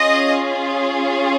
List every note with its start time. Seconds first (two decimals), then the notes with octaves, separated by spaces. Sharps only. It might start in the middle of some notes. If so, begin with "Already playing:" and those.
Already playing: C#4 F4 G#4 D#5